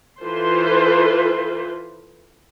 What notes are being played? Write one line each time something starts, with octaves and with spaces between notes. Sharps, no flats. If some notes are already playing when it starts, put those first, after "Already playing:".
E3 F4 A4 B4 C5